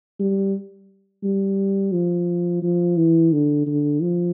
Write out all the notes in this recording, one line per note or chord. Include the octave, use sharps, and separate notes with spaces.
G3
G3
F3
F3
E3
D3
D3
F3